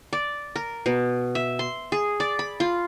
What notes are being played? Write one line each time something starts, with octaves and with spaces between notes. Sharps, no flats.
D5
A#4
B2
E5
C6
G#4
D5
B5
F4